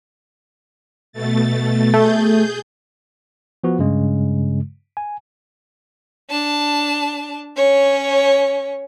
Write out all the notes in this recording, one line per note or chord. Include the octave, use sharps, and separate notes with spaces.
B2 A3 A6
A3 G#4 G6
F3 B3 F#4
G2 C#3 G#3
G#5
D4 A5
C#4 C#5